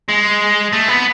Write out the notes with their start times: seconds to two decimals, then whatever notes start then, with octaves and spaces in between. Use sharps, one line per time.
0.09 G#3
0.73 A3
0.89 B3